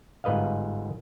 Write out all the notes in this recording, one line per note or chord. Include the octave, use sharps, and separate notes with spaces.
G1 G#2 B4 D#5 F5